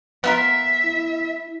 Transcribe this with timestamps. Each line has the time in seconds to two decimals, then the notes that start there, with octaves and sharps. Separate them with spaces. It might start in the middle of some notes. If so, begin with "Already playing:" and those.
0.24 B3 F4 A#4 E5
0.83 E4